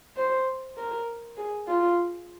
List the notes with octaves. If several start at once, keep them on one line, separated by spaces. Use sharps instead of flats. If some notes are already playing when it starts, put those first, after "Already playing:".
C5
A#4
G#4
F4